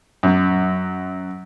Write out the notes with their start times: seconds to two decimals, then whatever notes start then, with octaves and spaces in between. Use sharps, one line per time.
0.23 F#2